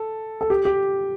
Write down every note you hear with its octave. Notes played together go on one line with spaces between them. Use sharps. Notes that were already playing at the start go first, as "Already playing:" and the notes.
Already playing: A4
A4
G4
G4